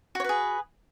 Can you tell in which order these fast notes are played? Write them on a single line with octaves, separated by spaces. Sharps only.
F#4 C#5 B4 G#4